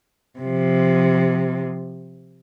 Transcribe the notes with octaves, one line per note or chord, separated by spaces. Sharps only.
C3 F3